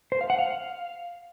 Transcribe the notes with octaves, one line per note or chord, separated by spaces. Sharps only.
C5
F5
F#5
F5